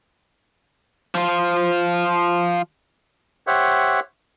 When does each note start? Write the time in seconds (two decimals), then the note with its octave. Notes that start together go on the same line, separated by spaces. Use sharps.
1.15 F3 F4
3.47 G4 C5 C#5 E5 F#5